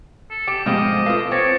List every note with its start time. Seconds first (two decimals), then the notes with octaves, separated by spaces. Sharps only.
0.30 A4
0.47 G4 D6 D7
0.66 G#2 B2 F3 A3 G4 D#5
1.06 F4 A4 B4 F5
1.31 C4 C#5 D6 A6 A#6